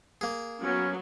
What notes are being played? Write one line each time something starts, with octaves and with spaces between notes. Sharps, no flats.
A#3 G#4
F#3 B3 C#4